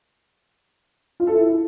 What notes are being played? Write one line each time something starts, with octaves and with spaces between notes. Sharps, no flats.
F4
A4
E4